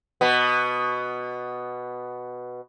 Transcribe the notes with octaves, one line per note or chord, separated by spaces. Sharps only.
B2 B3